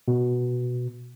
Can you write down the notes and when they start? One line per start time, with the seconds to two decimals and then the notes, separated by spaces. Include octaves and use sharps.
0.08 B2